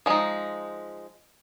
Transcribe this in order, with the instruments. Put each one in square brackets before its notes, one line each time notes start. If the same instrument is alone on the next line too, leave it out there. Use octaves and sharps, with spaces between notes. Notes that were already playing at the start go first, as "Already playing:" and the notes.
[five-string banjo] F3 G#3 D#4